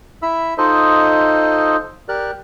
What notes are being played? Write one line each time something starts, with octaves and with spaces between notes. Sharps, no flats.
E4 E5 B5 E6
D#4 F4 A4 C5 D#5
G4 A#4 D5 F#6